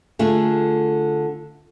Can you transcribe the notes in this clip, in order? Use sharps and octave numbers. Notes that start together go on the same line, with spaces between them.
D3 A3 F4 G#4